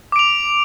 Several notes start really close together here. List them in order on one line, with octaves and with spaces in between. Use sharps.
D6 D7 F7